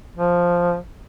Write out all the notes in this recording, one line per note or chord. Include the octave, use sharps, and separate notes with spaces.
F3